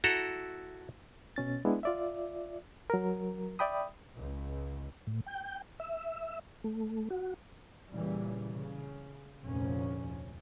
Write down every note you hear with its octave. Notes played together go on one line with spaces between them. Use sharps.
E4 F#4 A4 A#5
B2 C#4 A6
G#3 B3 D4 E4
F4 D5 E5
F#3 A#4
D5 E5 G5 B5 D#6
C#2
A2
G5
E5
A3
F#4
A#2 C#3 E3 G3
C#3
F1 D2 A#2 F3 C#4